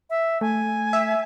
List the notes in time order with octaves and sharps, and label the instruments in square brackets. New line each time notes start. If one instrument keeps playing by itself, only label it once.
[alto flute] E5
[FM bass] A3 [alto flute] G#5
[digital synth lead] E5